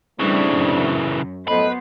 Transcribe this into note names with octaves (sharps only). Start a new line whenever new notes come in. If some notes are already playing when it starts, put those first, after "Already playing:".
C#3 E3 G3 A3 C4 D4
F#2
A2 F#3 B3 A4 B4 C5 D#5